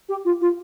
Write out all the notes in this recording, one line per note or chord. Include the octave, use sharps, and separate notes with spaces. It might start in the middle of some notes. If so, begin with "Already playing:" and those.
G4
F4
F4